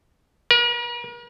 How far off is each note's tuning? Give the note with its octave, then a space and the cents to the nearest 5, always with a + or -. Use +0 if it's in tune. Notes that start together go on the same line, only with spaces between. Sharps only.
A#4 +45